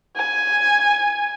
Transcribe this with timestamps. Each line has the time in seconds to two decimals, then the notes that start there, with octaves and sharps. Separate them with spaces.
0.16 G#5